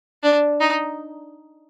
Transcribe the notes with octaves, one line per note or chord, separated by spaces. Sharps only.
D4
D#4